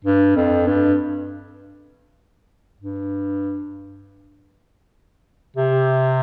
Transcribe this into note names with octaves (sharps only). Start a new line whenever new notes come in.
G2
F2
G2
G2
C3